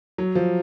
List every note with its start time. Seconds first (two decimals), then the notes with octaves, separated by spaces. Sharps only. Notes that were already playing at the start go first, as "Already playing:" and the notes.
0.18 F#3
0.35 F3